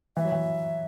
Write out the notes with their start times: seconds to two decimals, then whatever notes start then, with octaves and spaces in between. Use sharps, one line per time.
0.16 E3 E5
0.25 F#3
0.32 E3